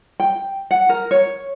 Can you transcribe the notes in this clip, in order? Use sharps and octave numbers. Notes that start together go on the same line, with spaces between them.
G5
F#5
A#4
C#5